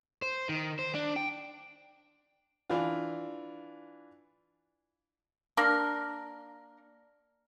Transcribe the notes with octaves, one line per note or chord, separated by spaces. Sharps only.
C5
D#3
C5
D4
G5
E3 D4 F4
A#3 D4 A#4